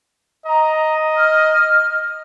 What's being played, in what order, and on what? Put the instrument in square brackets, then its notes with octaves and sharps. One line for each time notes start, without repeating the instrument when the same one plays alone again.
[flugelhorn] D#5 [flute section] A#5
[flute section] F6